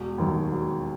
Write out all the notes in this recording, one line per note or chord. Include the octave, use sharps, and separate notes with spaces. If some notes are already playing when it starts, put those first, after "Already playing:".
Already playing: E1
D#2 D#3 F#3
E1